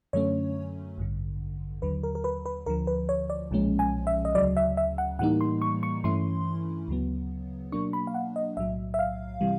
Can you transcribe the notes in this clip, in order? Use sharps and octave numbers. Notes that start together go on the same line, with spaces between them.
F#2 D3 F#3 A3 C#4 C#5
A1 G2 D3
D#2 D3 F#3 B4
A#4
A#4
B4
B4
D2 D3 F3 A#4
B4
C#5
D5
B1 A#2 F3 G#3 C#4
G#5
E5
D#5
D2 C#3 F#3 D5
E5
E5
F#5
A2 E3 G3 A#3 D#4 F#5
C6
C#6
C#6
G2 E3 A3 C#4 E4 C6
D2 C#3 F#3 B3
B2 F#3 A#3 D4 C#6
B5
F5
F#5
D#5
B1 A2 F#3 E5
E5
F5
C3 E3 G3